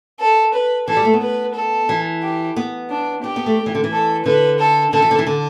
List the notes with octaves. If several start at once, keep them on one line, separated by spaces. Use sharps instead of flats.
A4
B4
E3 A4
G3
A3
B3
B4
A4
E3
G4
B3
D4
D4 G4
B3
A3
E3
D3
E3
A4
D3 B4
A4
D3 A4
E3
D3
E3
D3